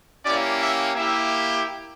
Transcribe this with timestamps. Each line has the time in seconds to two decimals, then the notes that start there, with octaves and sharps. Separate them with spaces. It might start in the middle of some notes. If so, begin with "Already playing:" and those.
0.24 A#3 C#4 E4 G4 D5
0.59 E5
0.95 A#3 E4 G4 E5